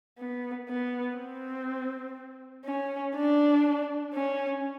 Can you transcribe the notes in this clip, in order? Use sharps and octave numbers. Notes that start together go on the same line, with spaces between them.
B3
B3
C4
C#4
D4
C#4